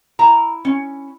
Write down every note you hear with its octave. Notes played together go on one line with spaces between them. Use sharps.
E4 A#5
C#4